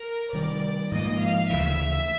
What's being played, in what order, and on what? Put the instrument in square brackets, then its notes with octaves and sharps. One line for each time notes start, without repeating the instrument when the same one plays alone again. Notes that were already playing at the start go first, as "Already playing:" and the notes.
Already playing: [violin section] A#4
[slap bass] C3 D#3 G3 [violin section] D5
[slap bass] G#2 F3 A#3 [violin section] D#5
[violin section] F5
[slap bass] D2 C#3 E3 [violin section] E5